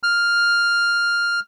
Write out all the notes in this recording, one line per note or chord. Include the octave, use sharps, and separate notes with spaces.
F6